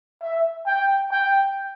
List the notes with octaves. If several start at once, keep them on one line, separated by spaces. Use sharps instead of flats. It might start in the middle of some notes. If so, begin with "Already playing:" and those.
E5
G5
G5